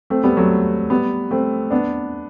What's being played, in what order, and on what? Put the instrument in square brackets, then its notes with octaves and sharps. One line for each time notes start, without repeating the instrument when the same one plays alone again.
[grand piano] A3 C4
G3 B3
F#3 A3
G3 B3
A3 C4
B3 D4